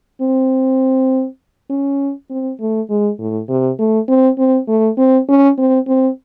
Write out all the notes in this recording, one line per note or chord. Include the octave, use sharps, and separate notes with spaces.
C4
C#4
C4
A3
G#3
A2
C3
A3
C4
C4
A3
C4
C#4
C4
C4